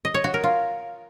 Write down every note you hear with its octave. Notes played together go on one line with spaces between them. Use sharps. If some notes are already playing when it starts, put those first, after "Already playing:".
D#5
C#5
F#4
A#4
F4